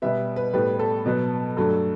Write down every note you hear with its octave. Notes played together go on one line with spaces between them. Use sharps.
B2 G3 B3 E5
B4
A2 G3 B3 B4
B4
A4
B2 F#3 B3
G2 F#3 A3 A4